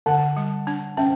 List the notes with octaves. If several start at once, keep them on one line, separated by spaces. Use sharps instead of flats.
D3 F#5 A5
G3
D4
C#4 E5 G5